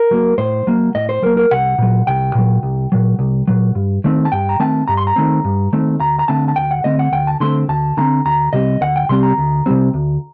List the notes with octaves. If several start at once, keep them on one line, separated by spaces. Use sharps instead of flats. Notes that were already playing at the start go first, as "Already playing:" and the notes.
Already playing: A#4
F#3 A#3
A2 C5
F#3 A#3
A2 D#5
C5
F#3 A#3 A#4
A#4
C2 F#5
A#2 F#3
C2 G5
A#2 F#3
C2
A#2 F#3
C2
A#2 F#3
G2
D#3 A3 C4
A5
G2 G5
A#5
D#3 A3 C4 A5
G2 A#5
C6
A#5
D#3 A3 C4
G2
D#3 A3 C4
D2 A#5
A#5
D3 A3 C4 A5
A5
D2 G5
F#5
D3 A3 C4 D#5
F#5
D2 G5
A5
D3 A3 C4 C6
D2 A5
D3 A3 C4 A#5
D2 A#5
C3 G3 C4 D#5
D2 F#5
G5
C3 G3 C4 C6
A#5
D2
C3 G3 C4
D2